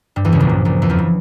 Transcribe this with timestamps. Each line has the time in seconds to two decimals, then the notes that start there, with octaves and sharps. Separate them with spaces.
0.16 G2 G3
0.25 E2 E3
0.32 C#2 C#3
0.40 A#1 A#2
0.49 G2
0.65 A#1 A#2
0.82 E2 E3
0.89 F2 F3
0.99 E3